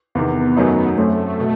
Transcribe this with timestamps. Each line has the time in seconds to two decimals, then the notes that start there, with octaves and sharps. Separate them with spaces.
0.15 E2 C3 D#3 B3
0.57 F#2 D#3 F#3 A3 D#4
0.98 F#2 F#3 A3 C4
1.40 B2